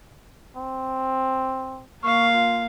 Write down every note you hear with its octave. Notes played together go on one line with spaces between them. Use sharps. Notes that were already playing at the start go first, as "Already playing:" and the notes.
C4
A#3 F5 C#6
F4